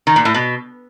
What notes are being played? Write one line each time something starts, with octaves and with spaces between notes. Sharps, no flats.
D#3
A#2
A2
B2